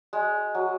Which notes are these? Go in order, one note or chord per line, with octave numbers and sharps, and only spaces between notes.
G#3
F#3